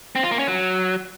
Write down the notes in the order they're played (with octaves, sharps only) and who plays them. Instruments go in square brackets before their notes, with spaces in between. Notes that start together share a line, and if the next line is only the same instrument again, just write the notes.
[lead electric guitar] C4
F4
A#3
C#4
F#3